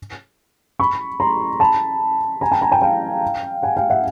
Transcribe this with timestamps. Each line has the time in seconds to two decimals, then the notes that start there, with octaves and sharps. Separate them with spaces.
0.79 B5 C#6
1.20 A#5 C6
1.60 A5 B5
2.41 G#5 A#5
2.52 G5 A5
2.61 G#5 A#5
2.71 G5 A5
2.82 F5 G5
3.63 F#5 G#5
3.77 F5 G5
3.90 E5 F#5